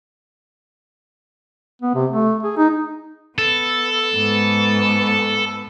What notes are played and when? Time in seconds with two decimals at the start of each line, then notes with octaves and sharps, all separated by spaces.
1.82 B3
1.95 C3
2.10 A3
2.43 G#4
2.57 D#4
3.38 B3 A4
4.13 G#2 B3